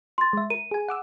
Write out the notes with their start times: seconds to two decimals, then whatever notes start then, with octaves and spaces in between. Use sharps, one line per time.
0.18 C6 A6
0.33 G#3 E5
0.50 A#4 D#7
0.71 G#4 G#5
0.88 F#5 D6 E6